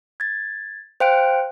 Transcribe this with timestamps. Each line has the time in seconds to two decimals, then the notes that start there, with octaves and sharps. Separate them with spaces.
0.20 G#6 A6
1.00 C5 F5 G5 F#6 D7